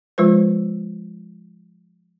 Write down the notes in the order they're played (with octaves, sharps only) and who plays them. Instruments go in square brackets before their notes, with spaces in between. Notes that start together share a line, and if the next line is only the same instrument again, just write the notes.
[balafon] F3 G#3 F4 B4 C5